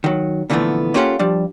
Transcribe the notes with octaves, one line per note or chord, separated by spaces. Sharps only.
D#3 F#3
A#2 D3 E3 F3 A3 B3
A#3 C#4 F4 G4 A4 F#5
F3 G3 D4